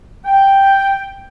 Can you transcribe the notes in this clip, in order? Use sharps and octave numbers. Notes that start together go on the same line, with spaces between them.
G5